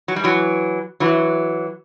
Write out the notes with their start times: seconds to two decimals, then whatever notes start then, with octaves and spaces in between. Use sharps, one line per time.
0.08 F#3
0.16 G3
0.24 E3 F#3
1.00 E3 F#3